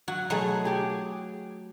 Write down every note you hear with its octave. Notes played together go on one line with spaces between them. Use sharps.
F#3 F#4
B2 F#3 A3 G#4
G4 G#4